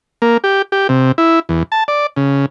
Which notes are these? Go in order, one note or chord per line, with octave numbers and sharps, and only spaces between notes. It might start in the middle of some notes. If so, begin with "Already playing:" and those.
A#3
G4
G4
C3
E4
E2
A5
D5
C#3